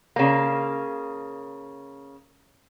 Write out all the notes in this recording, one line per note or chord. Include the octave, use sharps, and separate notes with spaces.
C#3 A#3